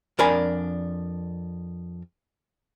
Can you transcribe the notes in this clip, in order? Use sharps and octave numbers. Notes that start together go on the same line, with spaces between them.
F2 D4 A#4 D5 G#5 B5